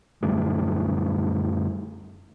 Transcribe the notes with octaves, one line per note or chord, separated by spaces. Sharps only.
F#2 D3 G3 A3